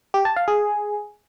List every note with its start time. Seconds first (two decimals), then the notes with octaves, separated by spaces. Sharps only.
0.14 G4
0.25 A5
0.36 F5
0.48 G#4